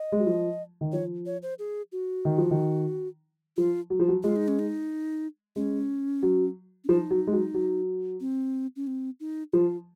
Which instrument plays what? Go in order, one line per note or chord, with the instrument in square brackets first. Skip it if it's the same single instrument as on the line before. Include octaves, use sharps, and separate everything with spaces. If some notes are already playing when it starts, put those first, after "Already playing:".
Already playing: [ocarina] D#5
[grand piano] G#3
F#3
F3
D#3
[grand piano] F3 [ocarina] C#5
[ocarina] C#5
C5
G#4
F#4
[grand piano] D#3
F3
D#3
[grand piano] F3 [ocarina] F4
[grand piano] F#3
F3
F#3
[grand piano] G#3 [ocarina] F4
[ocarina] D#4
C#4
D#4
[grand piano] G#3 [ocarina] C#4
[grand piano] F#3
[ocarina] C#4
[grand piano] F3 [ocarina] D#4
[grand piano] F#3
G#3
F#3
F#3
[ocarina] C4
C#4
C4
D#4
[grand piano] F3 [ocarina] F4